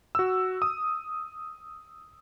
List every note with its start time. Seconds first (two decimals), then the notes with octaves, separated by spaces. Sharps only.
0.15 F#4 E6
0.62 D#6